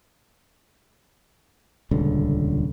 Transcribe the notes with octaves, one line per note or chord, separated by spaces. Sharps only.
D#1 C#2 D3